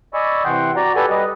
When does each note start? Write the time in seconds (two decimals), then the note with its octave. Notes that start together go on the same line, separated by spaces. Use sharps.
0.14 D5 D#5 G#5 B5 C#6 E6
0.45 C3 E3 F#5 G5 C6 G6
0.76 F#4 D5 A#5
0.96 G4 A4 B4 D5 G#5
1.10 G3 B4 D#5